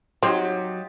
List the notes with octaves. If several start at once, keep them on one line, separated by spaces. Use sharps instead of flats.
F#3 C4 D#4 F4 G4